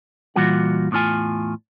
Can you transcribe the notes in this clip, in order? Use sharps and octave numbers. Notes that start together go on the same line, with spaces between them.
A#2 E3 G3 F4 F#4 F#5
E2 A2 D3 F4 G#5